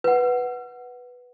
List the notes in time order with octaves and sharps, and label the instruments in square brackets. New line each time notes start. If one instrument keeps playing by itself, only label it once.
[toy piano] B4 F#5